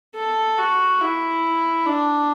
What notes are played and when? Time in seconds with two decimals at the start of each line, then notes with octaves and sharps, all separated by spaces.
0.16 A4
0.58 F#4
1.01 E4
1.86 D4